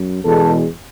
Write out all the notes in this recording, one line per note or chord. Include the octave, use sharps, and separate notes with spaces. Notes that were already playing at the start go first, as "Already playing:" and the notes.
Already playing: F#2
E2 B2 G#3 A4